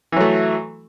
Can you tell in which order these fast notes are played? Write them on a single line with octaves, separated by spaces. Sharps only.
E3 F#3 A3